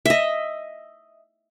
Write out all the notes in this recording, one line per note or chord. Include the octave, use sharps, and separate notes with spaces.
D#5 E5